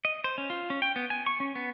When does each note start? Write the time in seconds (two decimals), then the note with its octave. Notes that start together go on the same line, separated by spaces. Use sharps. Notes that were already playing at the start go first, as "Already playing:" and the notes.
0.05 D#5
0.24 C5
0.38 C#4
0.50 F4
0.70 C#4
0.82 G5
0.96 B3
1.10 G#5
1.26 C#6
1.40 C#4
1.55 B3